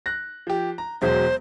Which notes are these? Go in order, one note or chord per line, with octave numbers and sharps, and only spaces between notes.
F#6 A#6
F3 G4
A#5
E1 F#3 G#3 C5